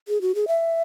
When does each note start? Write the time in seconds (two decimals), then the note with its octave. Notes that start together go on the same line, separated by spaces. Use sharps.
0.08 G#4
0.21 F#4
0.35 G#4
0.48 E5